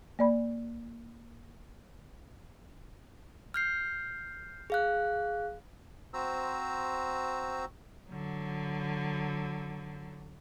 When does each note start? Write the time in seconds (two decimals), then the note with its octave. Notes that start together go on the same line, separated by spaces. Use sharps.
0.19 A#3 D5 B5
3.54 F6 G6 C7
4.70 G#4 F5 F#6
6.14 C4 F#4 C5 A#5 E6
8.09 D3 F#3